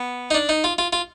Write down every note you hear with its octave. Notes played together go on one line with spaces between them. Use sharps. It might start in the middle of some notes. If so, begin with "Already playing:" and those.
Already playing: B3
D#4
D4
D#4
F4
F4
F4